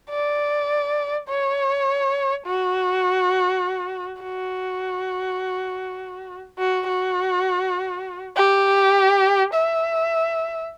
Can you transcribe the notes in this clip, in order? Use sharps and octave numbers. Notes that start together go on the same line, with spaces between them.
D5
C#5
F#4
F#4
F#4
F#4
G4
E5